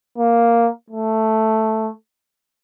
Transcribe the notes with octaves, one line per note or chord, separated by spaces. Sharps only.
A#3
A3